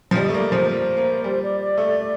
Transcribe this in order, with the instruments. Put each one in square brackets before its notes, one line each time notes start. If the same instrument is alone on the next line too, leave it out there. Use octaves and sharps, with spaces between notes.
[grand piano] F3
[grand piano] G3 [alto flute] D#5
[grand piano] A3
[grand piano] A#3 [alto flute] D5
[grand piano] F3 [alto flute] C5
[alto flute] C5
[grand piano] A#3
[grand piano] G3 [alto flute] C5
[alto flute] D5
D5
[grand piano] A3